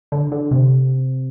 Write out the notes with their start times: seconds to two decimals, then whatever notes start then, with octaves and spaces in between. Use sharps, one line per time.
0.12 D3
0.32 D3
0.51 C3